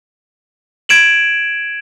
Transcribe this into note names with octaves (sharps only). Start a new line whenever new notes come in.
G#6 D7 E7 F#7